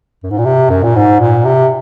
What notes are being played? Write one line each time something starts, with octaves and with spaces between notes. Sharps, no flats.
F#2
G#2
A#2
C3
F#2
A#2
G#2
A#2
C3